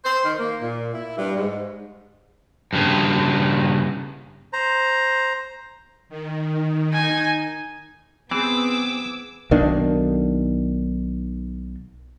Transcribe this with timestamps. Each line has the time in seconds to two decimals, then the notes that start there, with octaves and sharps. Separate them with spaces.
0.05 C5
0.25 D#3
0.39 A#3
0.62 A#2
0.93 E4
1.17 G2
1.36 G#2
2.73 G2 C#3
4.53 C5 A#5
6.09 D#3
6.93 D#4 G#5
8.31 E3 B3 C4 G#4 D6 E6
9.51 B1 D#3 A#3 D4